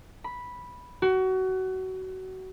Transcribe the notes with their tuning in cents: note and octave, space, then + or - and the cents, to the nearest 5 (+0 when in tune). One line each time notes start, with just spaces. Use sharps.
B5 -5
F#4 +25